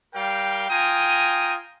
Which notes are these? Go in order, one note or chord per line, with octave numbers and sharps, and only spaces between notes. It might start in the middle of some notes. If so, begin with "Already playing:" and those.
G3 A#4 F5 G5
F4 G5 G#5 A#5 D#6